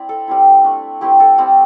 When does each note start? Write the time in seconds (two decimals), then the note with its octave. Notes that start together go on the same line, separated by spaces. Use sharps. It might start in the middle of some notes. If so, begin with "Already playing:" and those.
Already playing: C4 D4 E4 D5
0.09 A4
0.28 G3 C4 E4
0.64 A3 D4
1.01 A3 C4 E4 G4
1.20 A4
1.38 G3 C4 E4